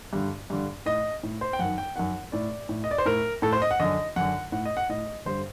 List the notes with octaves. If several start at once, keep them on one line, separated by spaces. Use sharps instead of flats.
G2 D3
G2 D3
A2 D#5
A2
C5
G5
F#2 D#3 F#5
G5
F#2 D#3 F#5
A2 D5
A2
D#5
D5
C5
A2 A#4
A2 A4
C5
D#5
F#5
F#2 D3 D#5
F#2 D3 F#5
A2 F#5
D#5
F#5
A2 D#5
G2 D3 C5